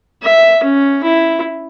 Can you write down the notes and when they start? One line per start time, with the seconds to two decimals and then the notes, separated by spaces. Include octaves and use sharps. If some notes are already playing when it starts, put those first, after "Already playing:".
0.22 E5
0.63 C#4
1.03 E4